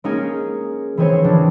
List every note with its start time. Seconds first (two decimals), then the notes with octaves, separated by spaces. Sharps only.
0.04 G#3 A#3 C#4 D#4 G#4
0.97 E3 G#3 C4 G#4 C5 C#5
1.24 E3 F3 D4